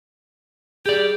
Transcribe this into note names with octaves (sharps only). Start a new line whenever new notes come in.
G4 G#4 D5